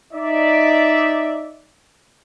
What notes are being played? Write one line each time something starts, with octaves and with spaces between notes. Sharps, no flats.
D#4 D5 E5